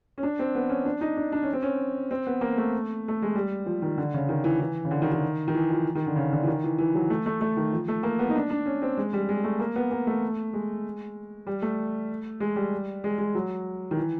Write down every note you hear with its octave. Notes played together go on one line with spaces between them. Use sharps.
C#4
D4
C4
B3
C#4
D4
D#4
D4
D4
C#4
C4
C#4
C4
B3
A#3
A3
A3
G#3
G3
F3
D#3
D3
C#3
D#3
E3
E3
C#3
D3
D#3
D#3
D#3
E3
F3
D#3
D3
C#3
D3
E3
D#3
E3
E3
F#3
A3
A3
A3
D#3
F3
A3
A#3
B3
D#4
D4
D4
C#4
C4
G#3
G3
G#3
A3
A#3
B3
A#3
A3
G#3
G3
A3
G#3
G3
G#3
G#3
F#3
D#3
E3